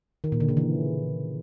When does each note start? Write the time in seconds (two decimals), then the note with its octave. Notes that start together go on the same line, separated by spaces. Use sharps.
0.24 D#3
0.32 A#2
0.40 D3
0.49 C#3
0.57 E3